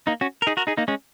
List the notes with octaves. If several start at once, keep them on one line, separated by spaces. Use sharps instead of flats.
A#3 D#4
C#4 F#4
A#4
D#4 G#4
F#4 A#4
D#4 G#4
A#3 D#4
G#3 C#4